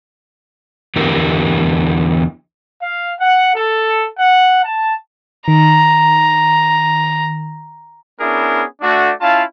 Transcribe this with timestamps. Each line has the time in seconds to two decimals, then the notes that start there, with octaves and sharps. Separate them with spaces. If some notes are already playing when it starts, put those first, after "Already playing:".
0.96 E2 D3 E4 G4 A#4
2.82 F5
3.20 F#5
3.56 A4
4.19 F#5
4.65 A5
5.48 D#3 A#5
8.19 B3 C#4 D4 E4 G#4 A#4
8.81 A3 D4 F#4
9.21 C#4 E4 F4 F5 A5